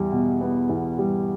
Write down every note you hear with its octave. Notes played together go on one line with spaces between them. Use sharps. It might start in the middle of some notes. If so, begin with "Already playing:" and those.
Already playing: E2 G3
B2
B3
E2
G3